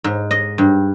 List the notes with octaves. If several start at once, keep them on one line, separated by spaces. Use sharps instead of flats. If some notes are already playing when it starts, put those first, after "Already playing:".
G#2
D#5
G2